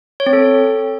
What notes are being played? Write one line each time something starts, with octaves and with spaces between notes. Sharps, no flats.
C#5
C4
A4